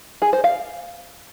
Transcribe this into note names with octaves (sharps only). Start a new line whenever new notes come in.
G#4
C5
F5